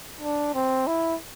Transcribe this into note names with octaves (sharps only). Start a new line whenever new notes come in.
D4
C4
E4